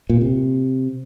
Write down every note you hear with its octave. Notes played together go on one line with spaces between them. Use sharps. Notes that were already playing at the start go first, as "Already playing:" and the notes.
A#2
C3